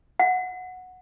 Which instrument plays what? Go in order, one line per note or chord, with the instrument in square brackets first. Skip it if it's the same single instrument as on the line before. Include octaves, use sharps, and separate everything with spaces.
[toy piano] F#5